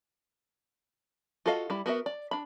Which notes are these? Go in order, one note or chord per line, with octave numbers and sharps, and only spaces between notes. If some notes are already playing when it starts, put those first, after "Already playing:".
F4 F#4 A4 D#5 F5
G3 E4
B3 F#4 A#4 E5
D5
D4 B5